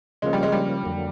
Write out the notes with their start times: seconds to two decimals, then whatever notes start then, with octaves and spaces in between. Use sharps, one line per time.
0.22 C#3 F3 G#3 A#3 C#4
0.33 G3
0.43 G#3
0.52 G3
0.84 F2 D3 F#3 A#3